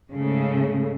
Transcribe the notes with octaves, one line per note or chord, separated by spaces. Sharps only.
G#2 C#3 A3